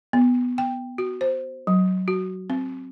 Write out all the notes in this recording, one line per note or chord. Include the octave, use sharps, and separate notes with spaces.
B3
G5
F#4
C5
F#3
F#4
C4